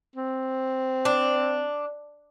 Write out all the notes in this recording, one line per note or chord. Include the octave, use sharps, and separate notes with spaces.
C4
D4